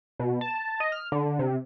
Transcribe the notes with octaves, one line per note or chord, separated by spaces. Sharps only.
B2
A5
D#5
F6
D3
C3